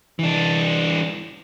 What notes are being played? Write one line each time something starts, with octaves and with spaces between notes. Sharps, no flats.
E3 D4